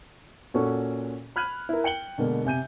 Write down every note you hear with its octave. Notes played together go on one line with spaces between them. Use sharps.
A#2 C#4 F#4 A4
B5 F6 F#6 G#6 D#7 F#7
E4 A#4
G5 C#7 F#7 G7
B2 D3 G#3 A#3
C3 G#5 G6 D#7